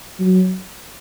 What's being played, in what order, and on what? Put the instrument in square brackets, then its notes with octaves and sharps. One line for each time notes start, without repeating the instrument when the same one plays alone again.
[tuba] F#3